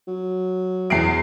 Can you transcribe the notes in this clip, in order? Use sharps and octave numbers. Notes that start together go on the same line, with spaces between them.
F#3
E2 C7 D7